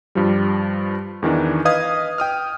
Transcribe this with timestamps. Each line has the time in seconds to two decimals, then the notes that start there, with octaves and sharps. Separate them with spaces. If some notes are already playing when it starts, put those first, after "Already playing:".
0.15 G2 F3 G3
1.22 E2 D#3 E3 D4
1.65 B4 D#5 F5 D#6 G#6
2.18 G5 D#6 F6